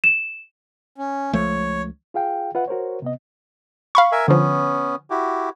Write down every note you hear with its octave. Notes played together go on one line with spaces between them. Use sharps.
E7
C#4
C#2 F3 A3 C#5
F4 G#4 F5 G5
F4 B4 E5 F#5
F#4 A#4 C5 C#5
C3 B3 D#5
F5 B5 C#6
A#4 E5 G#5
D3 F3 B3 C#4
E4 F#4 G4